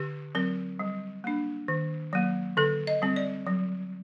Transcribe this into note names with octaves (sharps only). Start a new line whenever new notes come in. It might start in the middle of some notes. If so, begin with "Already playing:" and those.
Already playing: D3 G4
F#3 C4 A#4
G3
A#3 D4
D#3
F#3 A#3
D3 A4
D#5
G3 C4
D5
F#3